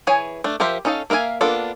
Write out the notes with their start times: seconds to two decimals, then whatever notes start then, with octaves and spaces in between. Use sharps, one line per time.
0.07 E3 G#4 C#5 G#5
0.44 A3 D4
0.60 F3 G4 A#4 C5 E5
0.85 C#4 D#4 A4 A#4 F5
1.10 A#3 A#4 E5 F5 G#5
1.41 A#3 B3 D4 F4 A4